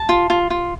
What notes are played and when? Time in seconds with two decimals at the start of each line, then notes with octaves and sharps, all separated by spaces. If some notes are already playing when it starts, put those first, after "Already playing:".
Already playing: A5
0.09 F4
0.30 F4
0.50 F4